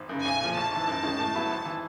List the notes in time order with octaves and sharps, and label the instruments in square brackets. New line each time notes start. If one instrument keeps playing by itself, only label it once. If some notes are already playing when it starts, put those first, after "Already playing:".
Already playing: [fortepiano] G#1
F#2 C#3
[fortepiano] B1 [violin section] G#5
[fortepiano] A#2 F3
[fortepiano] A#1 [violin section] A5
[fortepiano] G#2 E3
F#2
D#3 G#3 C#4
A2
F#3 B3 E4
G#1
E3